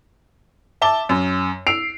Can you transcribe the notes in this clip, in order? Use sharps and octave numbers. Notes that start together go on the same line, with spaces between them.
E5 A5 D6 G7
F#2
E6 C7 D7 F7